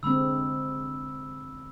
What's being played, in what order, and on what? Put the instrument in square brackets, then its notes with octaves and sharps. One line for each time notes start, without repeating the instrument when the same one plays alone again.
[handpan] D3 G#3 C4 [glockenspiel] B5 E6